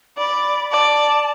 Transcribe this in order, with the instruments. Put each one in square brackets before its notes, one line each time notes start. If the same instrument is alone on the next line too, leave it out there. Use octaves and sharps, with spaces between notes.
[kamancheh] D5 [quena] B5
[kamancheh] D5 [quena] A5